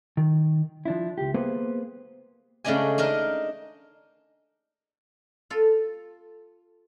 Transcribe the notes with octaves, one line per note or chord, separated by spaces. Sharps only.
D#3
F3 D4 E4
C#2 G4
A#3 B3 G#4 B4 C5
C#3 G#3 A3 D4 D#5 G#5
D4 D#4 A#4 D#5
F4 A4